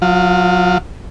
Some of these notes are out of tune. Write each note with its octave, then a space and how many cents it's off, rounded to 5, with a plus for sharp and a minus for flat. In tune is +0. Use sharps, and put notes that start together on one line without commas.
F#3 -30 F4 +0